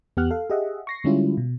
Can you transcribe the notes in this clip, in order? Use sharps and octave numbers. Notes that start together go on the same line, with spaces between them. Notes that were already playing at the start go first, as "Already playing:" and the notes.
E2 B3 G4 F#5 F6 F#6
A4 F5
G4 G#4 D#5 E5 F#5
C#6 A#6 C7
D3 G3 G#3 C#4 E4 F4
B2